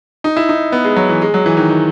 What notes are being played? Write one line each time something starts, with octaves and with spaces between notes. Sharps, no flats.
D#4
E4
D#4
B3
G#3
F#3
E3
G#3
F#3
E3
D#3
D#3